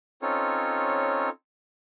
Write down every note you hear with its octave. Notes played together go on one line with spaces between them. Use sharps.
C4 C#4 D#4 F4 A4 C#5